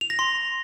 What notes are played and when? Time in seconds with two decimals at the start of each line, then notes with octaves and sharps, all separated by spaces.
0.01 F7
0.10 A#6
0.19 C6